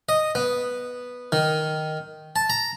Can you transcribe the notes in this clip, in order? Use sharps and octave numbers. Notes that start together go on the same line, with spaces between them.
D#5
B3
D#3
A5
A#5